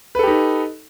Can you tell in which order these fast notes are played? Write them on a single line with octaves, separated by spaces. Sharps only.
B4 A4 G4 D#4